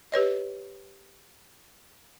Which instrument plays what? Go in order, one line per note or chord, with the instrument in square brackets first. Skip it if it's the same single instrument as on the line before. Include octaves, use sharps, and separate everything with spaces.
[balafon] G4 B4 C#5 D#5